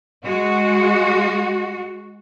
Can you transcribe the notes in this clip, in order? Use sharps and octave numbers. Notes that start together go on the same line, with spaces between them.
G#3 F#4